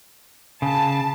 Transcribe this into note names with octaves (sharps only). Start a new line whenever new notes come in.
C#3 A5